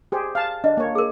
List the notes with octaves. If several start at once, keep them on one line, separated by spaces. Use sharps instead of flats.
G4 G#4 C5
F5 A5
D4 D#5
A#3 C#5
G#4 A#4